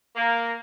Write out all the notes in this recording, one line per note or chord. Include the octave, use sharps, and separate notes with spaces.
A#3